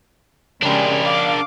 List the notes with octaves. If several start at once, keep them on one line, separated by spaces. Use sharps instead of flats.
C#3 G3 G#3 D4 A#4
F5 D6